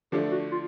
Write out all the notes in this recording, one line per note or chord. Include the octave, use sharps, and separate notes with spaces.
D3 F3 A3 D4 G4
F#4
F4